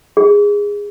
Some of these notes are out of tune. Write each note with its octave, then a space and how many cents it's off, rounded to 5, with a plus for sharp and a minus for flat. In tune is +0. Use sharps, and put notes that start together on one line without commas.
G#4 -20